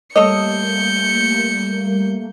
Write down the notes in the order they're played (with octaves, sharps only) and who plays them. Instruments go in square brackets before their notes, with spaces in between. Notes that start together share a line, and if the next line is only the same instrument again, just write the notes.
[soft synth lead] G3 [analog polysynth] A3 A#3 [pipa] A4 C#5 D#5 [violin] G6 C#7